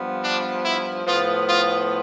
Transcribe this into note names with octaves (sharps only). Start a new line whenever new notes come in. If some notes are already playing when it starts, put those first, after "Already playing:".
Already playing: G2 F3 B3
D4
E4
A2 F3 B3 F4
F4